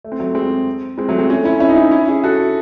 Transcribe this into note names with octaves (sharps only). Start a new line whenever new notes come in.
A3
C4
F#3 A3
G#3 C4
G#3 C4
F#3 A3
G#3 C4
A3 C#4
C#4 E4
C#4 E4
D#4
C#4 E4
C#4 E4
E4 G#4
F#4 A4